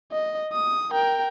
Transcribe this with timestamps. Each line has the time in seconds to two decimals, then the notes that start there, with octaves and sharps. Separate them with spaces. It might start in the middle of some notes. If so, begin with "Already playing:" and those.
0.12 D#5
0.53 D#6
0.92 A#4 G5